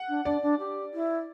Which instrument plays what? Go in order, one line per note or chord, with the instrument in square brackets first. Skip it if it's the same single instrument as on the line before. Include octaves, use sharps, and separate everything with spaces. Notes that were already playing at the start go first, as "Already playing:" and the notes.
Already playing: [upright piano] F#5
[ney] D4
[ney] D4 [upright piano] D5
[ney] D4
G4
E4